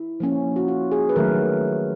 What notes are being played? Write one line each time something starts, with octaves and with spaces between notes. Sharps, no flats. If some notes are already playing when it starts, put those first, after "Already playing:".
Already playing: E4
F3 A#3 C#4
F#4
F4
G#4
B4
D#3 F#3 A3 A#4